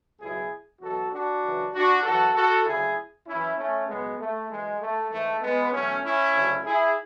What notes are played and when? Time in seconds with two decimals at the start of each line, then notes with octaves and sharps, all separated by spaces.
0.19 C#2 B2 F#3 E4 G#4
0.80 E2 B2 F#3 F#4 A4
1.11 D4 F#4
1.41 F#2 C#3 E3
1.72 D4 F#4
2.03 F#2 E3 F#4 A4
2.34 F#4 A4
2.65 D2 C#3 F#3 E4 G#4
3.26 F#2 E3 C#4 E4
3.56 A3 C#4
3.87 C#2 B2 F#3 G#3 B3
4.18 A3
4.49 F#2 E3 G#3
4.79 A3
5.10 G#2 E3 A3
5.40 G#3 B3
5.71 E2 B2 F#3 A3 C#4
6.02 C#4 E4
6.33 D2 C#3 F#3
6.64 E4 G#4